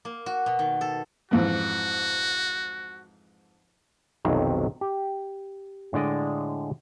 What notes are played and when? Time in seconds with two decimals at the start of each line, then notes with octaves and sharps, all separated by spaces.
0.05 A#3
0.26 F#4
0.46 B2
0.59 D#3
0.81 A4
1.31 F2 G#2 E3 F#4
4.25 B1 F2 C3 D#3 F#3
4.81 G4
5.93 A2 D3 G#3 D5 D#5